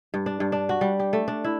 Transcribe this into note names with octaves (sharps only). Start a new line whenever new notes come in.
G2
D4
G2
D4
F#4
G3
G4
A3
D4
E4